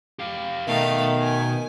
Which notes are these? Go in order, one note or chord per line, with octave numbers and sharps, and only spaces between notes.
G4 F5
B2 D#3 A3 F5
G#5